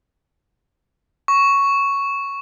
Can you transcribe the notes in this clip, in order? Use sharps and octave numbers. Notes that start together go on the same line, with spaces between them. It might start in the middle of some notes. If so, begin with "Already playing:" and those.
C#6